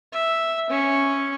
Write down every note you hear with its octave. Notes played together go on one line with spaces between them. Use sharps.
E5
C#4